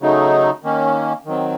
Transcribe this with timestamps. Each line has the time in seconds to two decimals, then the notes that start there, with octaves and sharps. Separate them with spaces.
0.01 C#3 F#3 A3 D#4
0.63 D#3 A#3 C#4
1.25 D#3 F#3 C4